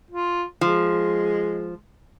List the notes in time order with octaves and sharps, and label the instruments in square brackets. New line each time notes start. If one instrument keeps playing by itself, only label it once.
[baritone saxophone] F4
[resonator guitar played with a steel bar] F3 [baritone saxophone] G#3